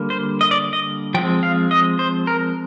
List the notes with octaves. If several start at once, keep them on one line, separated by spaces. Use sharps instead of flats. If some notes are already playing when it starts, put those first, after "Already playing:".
Already playing: D3 G3 A#3
C5
D#5
D5
D#5
F3 G#3 C4 G5
F5
D#5
C5
A#4